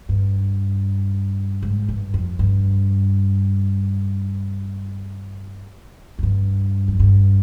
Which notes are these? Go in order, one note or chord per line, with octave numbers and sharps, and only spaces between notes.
G2
G#2
G2
F2
G2
F2
G2
F2
G2